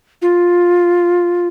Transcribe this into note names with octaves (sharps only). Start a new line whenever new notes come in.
F4